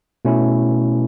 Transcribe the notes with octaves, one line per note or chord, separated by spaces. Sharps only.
B2 A3 C#4 E4